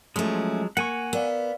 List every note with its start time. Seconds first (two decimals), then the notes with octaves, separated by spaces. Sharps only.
0.16 F3 F#3 G#3 A3 C#4
0.77 A#3 F#5 G#5 C#6
1.13 B3 A#4 D5 F5